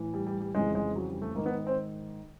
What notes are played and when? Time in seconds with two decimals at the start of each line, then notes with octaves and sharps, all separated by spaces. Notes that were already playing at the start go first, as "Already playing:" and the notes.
Already playing: A2 E3
0.14 G3
0.27 G3
0.41 G3
0.54 F2 C#3 E3 G#3
0.75 G#3
0.96 F#3
1.09 G3
1.22 A3
1.35 G#2 D#3 A#3
1.46 B3
1.67 C4